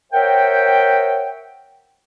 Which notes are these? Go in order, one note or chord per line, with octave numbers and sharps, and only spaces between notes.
A#4 C5 C#5 E5 F#5 G5